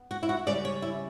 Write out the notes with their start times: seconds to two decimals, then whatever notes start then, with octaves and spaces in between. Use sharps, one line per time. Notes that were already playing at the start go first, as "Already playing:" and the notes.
Already playing: B3
0.11 F#4
0.23 E4
0.29 F#4
0.47 C#3 G3 C#4 D5
0.65 C#5
0.82 E4